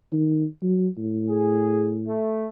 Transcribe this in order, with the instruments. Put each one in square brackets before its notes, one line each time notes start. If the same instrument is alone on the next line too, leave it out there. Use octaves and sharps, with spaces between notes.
[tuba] D#3
F#3
A2
[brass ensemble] G#4
A3